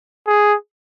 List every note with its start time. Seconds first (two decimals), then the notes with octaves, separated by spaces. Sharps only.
0.27 G#4